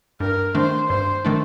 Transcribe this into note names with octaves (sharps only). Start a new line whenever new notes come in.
G2 A#4
D#3 A3 D4 C5
G2 C5
D#3 A3 D4